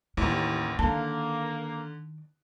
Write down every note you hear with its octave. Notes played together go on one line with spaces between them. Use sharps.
A1 D#2 D#3 E4
D3 D#3 A#3 A5